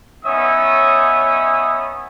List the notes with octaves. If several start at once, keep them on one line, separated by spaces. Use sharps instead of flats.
B3 C#4 D#4 C#5 E5 D#6